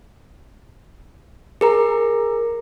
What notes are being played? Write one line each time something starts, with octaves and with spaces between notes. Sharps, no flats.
G#4 A#4 A#5